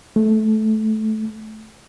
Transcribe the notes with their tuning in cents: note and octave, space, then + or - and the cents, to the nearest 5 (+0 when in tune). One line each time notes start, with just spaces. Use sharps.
A3 -15